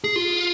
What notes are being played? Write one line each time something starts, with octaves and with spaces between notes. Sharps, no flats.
G#4
F4